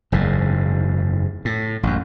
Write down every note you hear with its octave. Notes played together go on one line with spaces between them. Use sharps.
F#1 E2 G#2
A2
A1 F#2